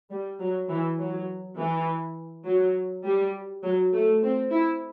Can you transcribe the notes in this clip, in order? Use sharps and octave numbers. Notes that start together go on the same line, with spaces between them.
G3
F#3
E3
F#3
E3
F#3
G3
F#3
A3
C4
E4